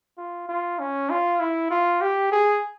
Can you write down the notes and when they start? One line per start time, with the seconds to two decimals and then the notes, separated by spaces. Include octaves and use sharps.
0.18 F4
0.49 F4
0.79 C#4
1.10 F4
1.40 E4
1.71 F4
2.01 G4
2.32 G#4